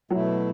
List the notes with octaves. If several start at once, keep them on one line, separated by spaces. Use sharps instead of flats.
B2 F#3 A3 E4